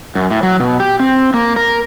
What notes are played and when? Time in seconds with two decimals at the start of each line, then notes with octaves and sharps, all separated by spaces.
0.15 F#2
0.31 A2
0.43 F#3
0.60 B2
0.80 G4
1.00 C4
1.34 A#3
1.56 A#4